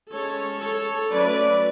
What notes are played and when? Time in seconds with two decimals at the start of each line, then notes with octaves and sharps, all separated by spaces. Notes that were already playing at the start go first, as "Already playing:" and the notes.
0.12 G#3 C#4 A4 C#5
0.61 A4 C#5
1.11 F#3 A3 C#4 B4 D5